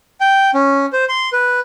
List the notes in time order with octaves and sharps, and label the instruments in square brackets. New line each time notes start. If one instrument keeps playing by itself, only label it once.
[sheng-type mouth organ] G5
C#4
C5
C6
B4